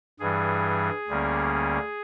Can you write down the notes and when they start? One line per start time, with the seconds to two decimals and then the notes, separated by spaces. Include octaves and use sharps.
0.20 G2 E3 G3 G#4
1.08 D2 D3 G3 A#3 C#4